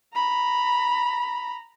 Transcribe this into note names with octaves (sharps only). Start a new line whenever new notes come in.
A#5 B5